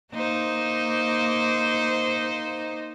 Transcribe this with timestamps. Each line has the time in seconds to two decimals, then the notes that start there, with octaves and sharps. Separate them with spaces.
0.12 A#3 D#4 C5